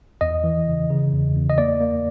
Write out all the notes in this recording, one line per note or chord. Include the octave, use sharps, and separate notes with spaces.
E2 D#5
E3
C#3
C#3
E2
E2
D#5
A#3 D5
A#3